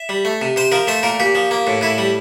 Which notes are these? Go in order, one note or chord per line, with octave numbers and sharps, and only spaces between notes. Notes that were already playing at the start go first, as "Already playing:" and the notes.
Already playing: E5
G3
A3
C3
C3 C5
F3 A#4
A3 C5
A#2 A#4
A#2 G4
F3
A#3
A2
A2 E4
G3